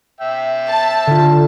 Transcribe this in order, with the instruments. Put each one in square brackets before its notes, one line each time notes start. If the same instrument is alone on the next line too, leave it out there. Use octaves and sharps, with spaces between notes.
[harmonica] E5 G5
[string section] A5
[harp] D3 F4